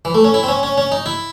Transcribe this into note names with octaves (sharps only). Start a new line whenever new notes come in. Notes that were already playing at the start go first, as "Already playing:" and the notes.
E3
A3
C#4
E4
C4
C#4
C#4
C#4
D#4
E4